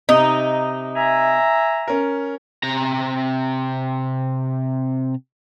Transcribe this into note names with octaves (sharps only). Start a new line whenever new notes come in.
C3 D#4
E5 G#5 A#5
C#4 A#4
C3 A#5